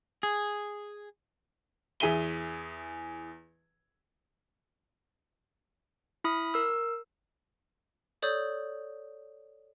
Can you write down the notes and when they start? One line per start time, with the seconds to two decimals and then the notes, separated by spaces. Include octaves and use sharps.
0.23 G#4
2.00 E2 G#4 E5 D#7 G7
6.24 E4 B5 D#6
6.54 A#4 E6
8.22 A4 C#5 D5 C#6 D#6 G6